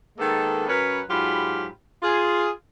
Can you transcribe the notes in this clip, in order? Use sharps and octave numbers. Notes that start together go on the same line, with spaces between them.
D#3 G#3 A#3 B3 A4
F#2 C#4 A#4 B4
G#2 F#3 F4 G4 B5
F4 G#4